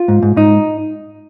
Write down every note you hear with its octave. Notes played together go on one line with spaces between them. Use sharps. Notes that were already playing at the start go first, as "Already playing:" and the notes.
Already playing: F4
G#2
G#2
G#2 D#4